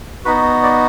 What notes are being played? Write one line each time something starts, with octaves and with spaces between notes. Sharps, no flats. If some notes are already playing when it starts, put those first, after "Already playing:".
B3 D#4 F#4 B4
D5